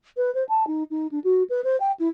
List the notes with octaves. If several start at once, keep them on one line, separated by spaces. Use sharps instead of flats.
B4
C5
A5
D#4
D#4
D4
F#4
B4
C5
G5
E4